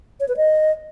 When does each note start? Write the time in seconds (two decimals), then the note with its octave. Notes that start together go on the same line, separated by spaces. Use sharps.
0.20 C#5
0.28 B4
0.37 D#5